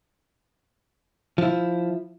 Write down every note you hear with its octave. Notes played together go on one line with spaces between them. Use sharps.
F3 E4